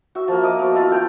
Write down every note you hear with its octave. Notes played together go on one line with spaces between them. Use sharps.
F#4 E5
F3 A#3
D#5 D6
B3 F#4
E4 F4
A3 F#5 G5